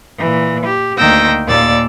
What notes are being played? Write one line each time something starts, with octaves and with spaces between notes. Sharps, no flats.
A#2 E3
G4
D2 D#3 A#3 G5 E6 A#6
D#2 A#2 D5 E6 A6